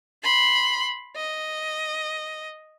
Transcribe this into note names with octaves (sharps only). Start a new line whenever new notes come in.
B5 C6
D#5